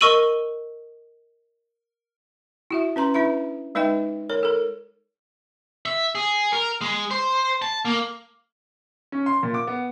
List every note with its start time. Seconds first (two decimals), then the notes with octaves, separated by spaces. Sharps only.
0.01 A#4 D#5 C#6 E6 D#7 F#7
2.71 E4 F#4 E5
2.96 C#4 B4 A#5 C6
3.14 D4 E4 B4 E5 B5
3.75 G#3 D#4 B4 D#5 E5 G5
4.30 A#4 C#5
4.43 A4 A#4
5.86 E5
6.15 G#4
6.53 A#4
6.81 G#3
7.11 C5
7.62 A5
7.85 A#3
9.12 C#4
9.26 C6
9.43 A#2
9.54 D6
9.67 B3